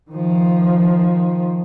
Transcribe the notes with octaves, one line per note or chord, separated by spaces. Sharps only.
D#3 F3